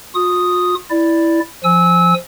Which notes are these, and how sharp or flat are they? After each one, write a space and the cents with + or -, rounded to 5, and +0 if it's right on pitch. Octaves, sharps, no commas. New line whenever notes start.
F4 +45 D#6 +0
E4 +0 D5 +0
F3 +0 G#5 +5 E6 -20